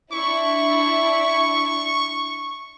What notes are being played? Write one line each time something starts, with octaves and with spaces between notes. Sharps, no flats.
D4 E4 C#6